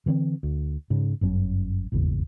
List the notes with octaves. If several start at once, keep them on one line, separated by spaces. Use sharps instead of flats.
D3 E3 A3 C4
D2
G#2 C#3
G1 F#2 F#3 C#4
D#1 G#1 E2 C#3